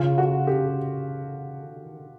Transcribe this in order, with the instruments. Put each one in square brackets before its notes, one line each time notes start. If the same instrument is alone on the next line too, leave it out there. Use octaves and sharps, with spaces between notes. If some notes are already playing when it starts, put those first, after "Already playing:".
Already playing: [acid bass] C#3 [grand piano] F4
[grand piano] F#4
G4
[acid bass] D3
D#3
D3